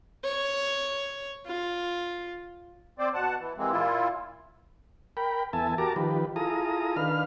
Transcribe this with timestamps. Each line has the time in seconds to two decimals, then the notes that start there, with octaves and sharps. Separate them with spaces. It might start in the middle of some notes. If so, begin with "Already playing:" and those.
0.24 C#5
1.46 F4
2.99 C4 C5 D5
3.14 B2 F#5 A5
3.39 E3
3.58 C3 E3 G#3 A#3 C4
3.72 A#2 E4 F4
5.17 A#4 G5 B5
5.53 E2 B3 A4 E5 G#5 A5
5.78 F#4 G4 A#4 A5 A#5 D6
5.96 D#3 F3 G4 B4
6.36 E4 F4 G#4 A4 A#5 D#6
6.96 D#3 D4 B4 F5 F6